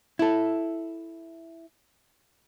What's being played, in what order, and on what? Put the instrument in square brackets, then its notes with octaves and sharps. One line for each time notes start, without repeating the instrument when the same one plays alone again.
[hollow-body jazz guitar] E4 A4